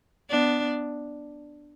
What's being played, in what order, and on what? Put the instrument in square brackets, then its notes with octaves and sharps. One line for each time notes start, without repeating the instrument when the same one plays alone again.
[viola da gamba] B3 D4